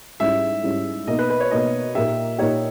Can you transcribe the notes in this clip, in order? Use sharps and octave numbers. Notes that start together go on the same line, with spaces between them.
G#2 G3 C#4 E4 E5
G#2 G3 C#4 E4
B2 A#3 D#4 D#5
B4
B4
C#5
B2 A#3 D#4 D#5
A#2 A#3 D#4 G4 E5
A#2 A#3 D#4 G4 C#5